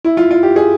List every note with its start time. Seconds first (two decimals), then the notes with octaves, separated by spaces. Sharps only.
0.05 E4
0.17 F4
0.31 F4
0.43 G4
0.56 G#4